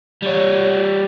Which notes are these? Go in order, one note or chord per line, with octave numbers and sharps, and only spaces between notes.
G3 C#5